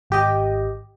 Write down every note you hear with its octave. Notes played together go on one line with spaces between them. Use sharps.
G#1 G4 D#5